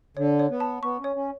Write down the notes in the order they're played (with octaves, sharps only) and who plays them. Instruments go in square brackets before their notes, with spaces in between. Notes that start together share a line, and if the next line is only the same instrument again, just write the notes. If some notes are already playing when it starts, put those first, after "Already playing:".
[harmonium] D3 [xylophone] C#5
[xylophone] C#5
[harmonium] B3
[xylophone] A5
[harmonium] B3 [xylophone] C#6
[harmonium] C#4 [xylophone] C#5
[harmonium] C#4